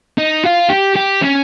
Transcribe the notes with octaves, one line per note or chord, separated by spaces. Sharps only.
D#4
F4
G4
G4
C#4